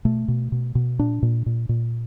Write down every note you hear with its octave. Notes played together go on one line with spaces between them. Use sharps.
B2 A3
B2
B2
B2
A#2 D4
A#2
A#2
A#2